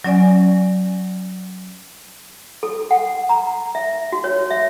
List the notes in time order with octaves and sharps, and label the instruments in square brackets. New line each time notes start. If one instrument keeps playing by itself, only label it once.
[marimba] F#3 C#4 D5 G#5
[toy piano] A4
F#5
A#5
E5
F#4
C#5
E5